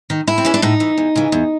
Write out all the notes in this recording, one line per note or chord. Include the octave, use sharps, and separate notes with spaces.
D#3
A2 E4
C4
E3 C#4
D4
A2 D#4
E3
E2
C#3 E3
E2